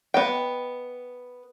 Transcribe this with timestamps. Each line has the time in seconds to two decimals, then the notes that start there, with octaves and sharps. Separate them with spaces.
0.14 B3 D#5 G5